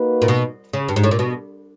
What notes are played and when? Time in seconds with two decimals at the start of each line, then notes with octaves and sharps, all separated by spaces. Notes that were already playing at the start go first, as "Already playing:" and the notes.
Already playing: A#3 D#4 F#4 B4
0.22 A#2
0.28 B2
0.73 C#3
0.89 G2
0.96 G#2
1.04 A2
1.11 A#2
1.19 B2